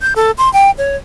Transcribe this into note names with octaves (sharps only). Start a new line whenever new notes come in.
G6
A4
C6
G5
C#5